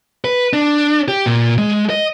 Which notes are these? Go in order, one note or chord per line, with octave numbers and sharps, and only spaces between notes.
B4
D4
G4
A#2
G#3
D#5